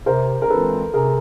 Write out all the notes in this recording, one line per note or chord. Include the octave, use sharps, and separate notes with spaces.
C3 A#4 C5
A#4
E3 G#3 C4 F4 A4 B4
C3 G#4 A#4